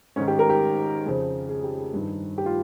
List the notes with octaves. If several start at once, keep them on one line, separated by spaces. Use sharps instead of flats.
G#2 D#3 C#4
G4
A#4
G4
F2 C#3 F3
G#4
G4
G#4
G2 D#3
G4
F4